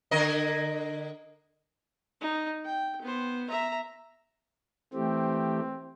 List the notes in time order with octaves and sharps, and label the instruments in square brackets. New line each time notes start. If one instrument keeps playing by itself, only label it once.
[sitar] D3 A#4 D#5
[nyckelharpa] D#4
G5
B3 C5
E5 A#5
[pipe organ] E3 A3 G4 [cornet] C4